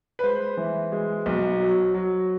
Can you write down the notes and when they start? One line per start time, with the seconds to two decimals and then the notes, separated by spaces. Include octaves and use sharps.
0.19 B4
0.23 G#3 C5
0.57 E3
0.92 G#3
1.26 B1
1.60 F#3
1.94 F#3